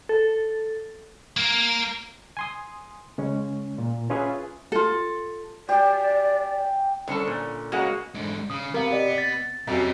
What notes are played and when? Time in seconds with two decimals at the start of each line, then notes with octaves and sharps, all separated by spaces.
0.09 A4
1.37 A#3 A#4
2.37 G#5 C6 D#6
3.18 C#3 G#3 C#4
3.78 A#2
4.10 C#4 F4 G#4 B4 E5 G#5
4.72 F4 A4
5.69 G4 D5 G#5
7.08 C2 D3 C#4 A4
7.28 A#2
7.72 C#3 G#3 A#3 F#4
8.14 G#2 D3
8.50 C#3 D#6
8.74 C3 B3 A#4 F5
8.91 G4 D5 D#5
9.18 A6
9.67 F2 C3 F#3 C#4